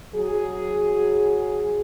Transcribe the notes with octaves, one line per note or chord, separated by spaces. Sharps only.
F#3 G#4